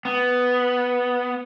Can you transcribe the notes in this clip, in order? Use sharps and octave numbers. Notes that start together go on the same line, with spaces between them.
B3